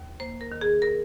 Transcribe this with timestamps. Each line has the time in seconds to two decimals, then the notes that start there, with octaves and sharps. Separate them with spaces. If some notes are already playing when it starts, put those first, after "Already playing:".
Already playing: D#2
0.20 A#3 C5
0.41 A#4
0.52 D#3
0.61 G#4
0.82 A#4